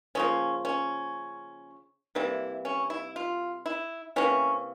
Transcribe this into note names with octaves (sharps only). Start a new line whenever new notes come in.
C#3 F3 A#3 C#4
C#4
C3 E3 G3 A#3 E4
C#4
E4
F4
E4
C3 E3 A#3 C#4